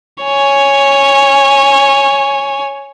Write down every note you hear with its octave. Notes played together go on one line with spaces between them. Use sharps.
C#5 G#5